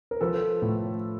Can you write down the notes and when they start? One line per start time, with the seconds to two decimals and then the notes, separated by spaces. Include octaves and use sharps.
0.11 A#4
0.21 F3 A4 B4
0.62 A2